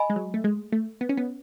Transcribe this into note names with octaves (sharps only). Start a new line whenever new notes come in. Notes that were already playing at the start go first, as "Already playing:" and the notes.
Already playing: D#5 G#5 B5
G#3
F#3
A3
G#3
A3
B3
C#4
B3